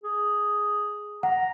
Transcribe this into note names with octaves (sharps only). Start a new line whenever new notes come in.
G#4
F#5 A#5